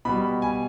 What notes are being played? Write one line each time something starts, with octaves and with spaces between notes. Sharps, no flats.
B2 G3 B5
G#5